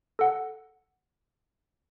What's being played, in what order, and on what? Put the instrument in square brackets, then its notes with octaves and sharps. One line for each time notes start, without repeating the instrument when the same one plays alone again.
[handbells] A4 F#5